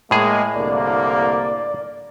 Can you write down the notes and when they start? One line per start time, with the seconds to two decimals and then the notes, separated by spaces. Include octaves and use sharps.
0.11 A2 G#3 A#3 G#4
0.56 C2 D3 A#3 D5